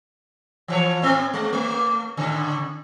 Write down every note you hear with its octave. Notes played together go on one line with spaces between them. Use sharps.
E3 F3 C#5
A2 B3 C4
G#3
A3
A2 C#3